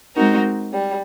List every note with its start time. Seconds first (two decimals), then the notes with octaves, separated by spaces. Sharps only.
0.16 G#3 C4 D#4 F#4 A#4
0.73 G3